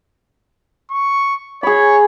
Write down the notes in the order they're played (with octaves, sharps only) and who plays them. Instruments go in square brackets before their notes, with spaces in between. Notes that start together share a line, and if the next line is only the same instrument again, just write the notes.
[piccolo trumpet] C#6
[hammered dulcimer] G#4 B5 [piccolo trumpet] C#5